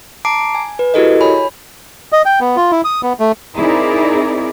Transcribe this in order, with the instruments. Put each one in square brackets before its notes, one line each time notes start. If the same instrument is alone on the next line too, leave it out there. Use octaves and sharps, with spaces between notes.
[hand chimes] A5 A#5 D6 C7 D7
G#5
B4
E4 F#4 G4 A4 A#4 D#5
C#5 G#5 B5
[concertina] D#5
G5
B3
F4
E4
D#6
B3
A3
[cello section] C4 D#4 E4 G#4 A#4 D5